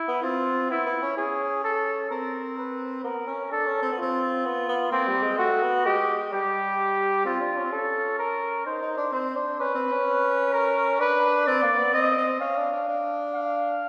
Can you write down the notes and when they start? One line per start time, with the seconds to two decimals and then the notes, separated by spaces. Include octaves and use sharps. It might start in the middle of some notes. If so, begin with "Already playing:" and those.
Already playing: E4
0.08 B3
0.23 C4 F4
0.70 B3 E4
0.86 B3
1.02 C#4
1.17 C#4 G#4
1.64 A4
2.10 C4 A#4
2.58 B4
3.04 B3 A#4
3.27 C#4
3.51 D4 A4
3.66 C#4
3.82 C4
3.92 B3
3.98 C4 F4
4.45 B3
4.68 B3
4.91 A#3 C4
5.08 G3
5.23 G#3
5.38 A3 F#4
5.62 B3
5.85 G#3 G4
6.33 G3 G4
7.26 C4 F4
7.41 D4
7.57 C#4
7.65 C4
7.72 C#4 A4
8.19 A#4
8.66 D#4 C5
8.82 D#4
8.97 D4
9.12 C4 C5
9.36 D4
9.60 C#4 B4
9.75 C4
9.91 C#4
10.53 A#4
10.99 D4 B4
11.46 C4 D5
11.62 A#3
11.79 B3
11.93 C4 D#5
12.18 C4
12.40 C#4 F5
12.57 D4
12.72 D4
12.88 D4
13.34 F5